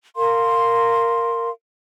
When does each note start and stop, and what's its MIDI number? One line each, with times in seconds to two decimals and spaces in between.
0.16 1.50 70
0.16 1.50 77
0.16 1.50 84